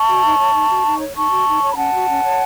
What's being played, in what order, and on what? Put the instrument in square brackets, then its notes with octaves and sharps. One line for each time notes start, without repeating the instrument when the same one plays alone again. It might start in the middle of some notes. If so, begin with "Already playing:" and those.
Already playing: [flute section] A5 C#6
F#4
D#4
C#5
D#4
F#4
D#4
C#5
D#4 A5 C#6
F#4
D#4
C#5
B5
C#4 F#5 A5
F#4
C#4
C#5